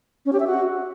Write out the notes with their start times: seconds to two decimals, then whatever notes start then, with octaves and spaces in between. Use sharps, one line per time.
0.26 C#4
0.33 G4
0.40 E5
0.47 F#4